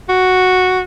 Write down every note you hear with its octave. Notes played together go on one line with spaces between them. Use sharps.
F#4